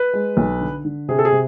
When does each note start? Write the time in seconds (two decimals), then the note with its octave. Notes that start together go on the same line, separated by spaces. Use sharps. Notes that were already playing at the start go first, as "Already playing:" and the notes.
Already playing: B4
0.13 G#3
0.37 B1
0.61 D3
0.85 D3
1.08 C3 G#4
1.19 A4
1.25 G#4
1.32 C3